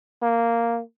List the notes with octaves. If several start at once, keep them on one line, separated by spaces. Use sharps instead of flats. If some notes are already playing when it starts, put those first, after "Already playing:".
A#3